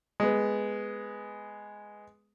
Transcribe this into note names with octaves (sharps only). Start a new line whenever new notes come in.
G#3 B3